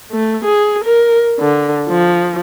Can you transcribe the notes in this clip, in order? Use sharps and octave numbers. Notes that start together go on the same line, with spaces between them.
A3
G#4
A#4
D3
F3